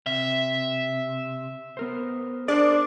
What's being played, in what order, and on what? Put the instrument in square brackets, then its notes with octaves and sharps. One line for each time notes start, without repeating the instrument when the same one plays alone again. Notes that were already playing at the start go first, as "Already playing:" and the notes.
[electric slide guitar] C3 [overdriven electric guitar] E5
[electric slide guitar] B3 A#4 C5
[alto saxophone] D4 [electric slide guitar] G#4 A#4 C5 [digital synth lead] D5